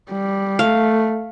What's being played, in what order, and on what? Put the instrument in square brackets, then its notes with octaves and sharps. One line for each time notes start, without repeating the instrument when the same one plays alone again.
[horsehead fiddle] G3
[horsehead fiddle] A3 [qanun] F5